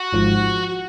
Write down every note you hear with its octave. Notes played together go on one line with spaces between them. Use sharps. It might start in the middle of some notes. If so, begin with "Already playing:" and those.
Already playing: F#4
G#1 G#2 F3